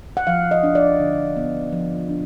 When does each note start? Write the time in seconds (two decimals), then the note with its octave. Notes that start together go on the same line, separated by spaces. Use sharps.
0.17 F#5
0.27 F3 F5
0.51 D#5
0.63 D4
0.75 D5
1.00 D3
1.37 B3
1.72 F3
2.09 D4